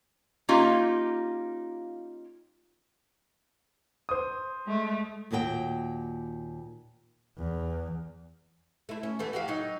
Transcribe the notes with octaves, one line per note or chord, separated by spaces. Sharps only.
A#3 C#4 D#4 F4 G4
C5 D#6
G#3 A3
D#2 A#2 F#4 A4 G5
E2
A3 E4
C#4
E2 E3 A3
F#4 G4 F5
F#3 D#4